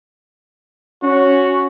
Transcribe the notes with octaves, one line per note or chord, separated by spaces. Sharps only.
C#4 F#4